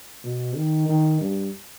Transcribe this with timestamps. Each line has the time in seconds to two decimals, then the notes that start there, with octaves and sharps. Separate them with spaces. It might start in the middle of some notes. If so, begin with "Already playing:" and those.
0.24 B2
0.56 D#3
0.89 D#3
1.21 G2